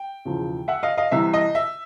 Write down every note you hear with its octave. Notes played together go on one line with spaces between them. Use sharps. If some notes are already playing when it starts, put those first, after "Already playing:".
Already playing: G5
E1 E2 C#3 F3
E5 F#5
D#5 F5
D#5 F5
C2 C3 E3 E5
D#5
E5